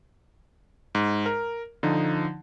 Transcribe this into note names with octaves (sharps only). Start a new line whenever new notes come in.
G#2
A#4
D3 F3 D#4